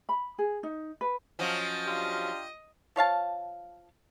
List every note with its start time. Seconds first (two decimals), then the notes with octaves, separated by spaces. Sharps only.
0.09 B5
0.38 G#4
0.63 D#4
1.01 B4
1.39 F3 F#3 C#4 D#5
1.85 D4 F4 G4
2.96 F3 C#5 F5 A5